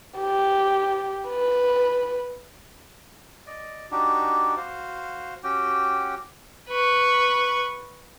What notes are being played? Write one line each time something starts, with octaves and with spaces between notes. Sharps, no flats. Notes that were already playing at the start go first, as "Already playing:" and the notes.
G4
B4
D5 D#5
D4 D#4 F#4 G4
F#4 C5 F5
C#4 F#4 G4 G5
B4 C#6